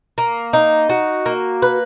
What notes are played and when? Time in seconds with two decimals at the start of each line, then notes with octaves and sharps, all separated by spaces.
0.18 A#3
0.53 D#4
0.89 F#4
1.26 A#3
1.62 B4